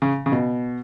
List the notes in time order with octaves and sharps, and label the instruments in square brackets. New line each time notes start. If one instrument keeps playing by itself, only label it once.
[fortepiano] C#3
C#3
B2